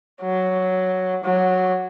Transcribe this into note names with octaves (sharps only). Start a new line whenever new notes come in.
F#3
F#3